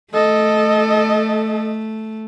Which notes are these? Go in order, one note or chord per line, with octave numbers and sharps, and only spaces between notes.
A3 A4 D#5